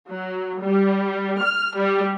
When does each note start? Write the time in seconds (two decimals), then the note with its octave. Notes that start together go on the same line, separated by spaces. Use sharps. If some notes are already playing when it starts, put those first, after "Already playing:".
0.10 F#3
0.64 G3
1.41 F6
1.76 G3